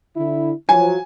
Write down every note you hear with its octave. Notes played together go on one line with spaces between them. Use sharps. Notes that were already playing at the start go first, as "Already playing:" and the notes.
D3 E4
F3 F#3 G#5